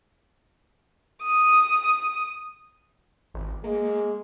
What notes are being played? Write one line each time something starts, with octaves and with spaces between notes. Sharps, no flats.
D#6
G#1
G#3 A#3